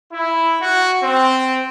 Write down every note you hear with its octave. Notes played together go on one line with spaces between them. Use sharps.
E4
F#4
C4